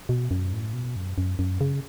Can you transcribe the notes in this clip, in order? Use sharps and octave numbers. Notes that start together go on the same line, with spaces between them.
B2
F#2
A2
B2
F#2
F#2
F#2
C#3